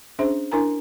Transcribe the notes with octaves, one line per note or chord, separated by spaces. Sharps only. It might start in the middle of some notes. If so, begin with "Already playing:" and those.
C#4 D4 G#4 C5 E5
D4 E4 A#4 G#5 A#5